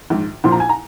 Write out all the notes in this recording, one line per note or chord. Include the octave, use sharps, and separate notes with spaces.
A#1 G#2 D#3
A#1 A#2 F3 C6
A#5
G#5
A#5